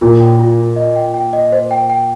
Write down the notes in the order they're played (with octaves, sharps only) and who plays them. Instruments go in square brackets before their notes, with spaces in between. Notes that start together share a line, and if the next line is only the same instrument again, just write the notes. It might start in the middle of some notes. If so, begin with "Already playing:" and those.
[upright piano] A#2 [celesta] F4
[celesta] G5
F4
F4
D#5
G5
G5
D#5
C5
G5
G5